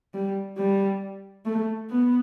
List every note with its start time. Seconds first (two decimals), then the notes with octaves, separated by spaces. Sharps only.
0.14 G3
0.58 G3
1.46 A3
1.90 B3